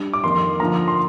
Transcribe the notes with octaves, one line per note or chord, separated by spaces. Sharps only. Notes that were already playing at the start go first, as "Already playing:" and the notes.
Already playing: G3 D4
D6
F2 D#3 A#3 D#4 C6
D3 F3 A#3 D4 A#5
C6